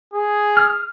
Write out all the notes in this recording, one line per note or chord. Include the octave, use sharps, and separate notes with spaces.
G#4
F6